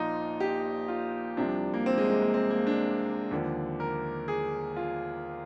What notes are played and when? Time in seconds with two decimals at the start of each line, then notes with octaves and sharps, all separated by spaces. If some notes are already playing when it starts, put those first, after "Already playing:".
Already playing: A#1 A#2 F3 D#4 F4
0.40 G4
0.88 F4
1.37 C2 C3 F3 D4
1.74 A#3
1.86 C4
1.98 G#3
2.10 G#3
2.22 A#3
2.34 C4
2.50 A#3
2.67 D4
3.31 D#2 D3 F3
3.80 A#4
4.28 G#4
4.76 F4